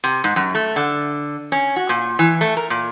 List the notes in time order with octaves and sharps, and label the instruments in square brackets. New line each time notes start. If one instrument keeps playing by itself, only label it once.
[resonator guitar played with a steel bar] C3
G#2
F#2
A3
D3
C#4
F#4
A#2
E3
A3
A#4
A#2